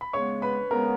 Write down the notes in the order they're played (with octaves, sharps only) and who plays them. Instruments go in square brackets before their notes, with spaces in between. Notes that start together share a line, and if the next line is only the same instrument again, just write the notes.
[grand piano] B5
[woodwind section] C#3 G#3 B3 [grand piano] C#5 C#6
[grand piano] B4 B5
[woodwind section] C#3 G#3 B3 [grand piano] A#4 A#5